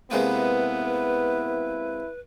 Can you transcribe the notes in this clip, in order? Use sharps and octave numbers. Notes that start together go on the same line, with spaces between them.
C3 G#3 A#3 B3 E4 B4